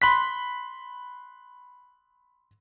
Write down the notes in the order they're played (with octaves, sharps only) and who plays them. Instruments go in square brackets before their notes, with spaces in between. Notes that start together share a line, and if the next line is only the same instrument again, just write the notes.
[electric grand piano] B5 C6 F#6 B6